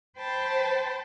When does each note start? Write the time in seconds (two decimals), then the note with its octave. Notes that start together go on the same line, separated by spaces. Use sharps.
0.17 C5 G5 A5 B5